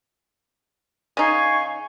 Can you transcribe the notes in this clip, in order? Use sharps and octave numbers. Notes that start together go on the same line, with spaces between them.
C#3 D#4 F5 G#5 C#6